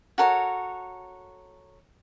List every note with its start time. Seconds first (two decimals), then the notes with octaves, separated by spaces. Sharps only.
0.18 F#4 A4 A#4 C#5